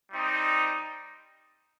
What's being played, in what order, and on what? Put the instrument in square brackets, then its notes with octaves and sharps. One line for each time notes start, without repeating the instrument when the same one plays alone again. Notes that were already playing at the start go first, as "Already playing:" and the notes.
[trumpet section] G3 C4 D#4